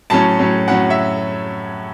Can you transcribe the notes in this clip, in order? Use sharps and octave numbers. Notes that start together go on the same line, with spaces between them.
A2 F#3 C#4 A5
A2 F#3 C#4
A2 F#3 C#4 F#5
E5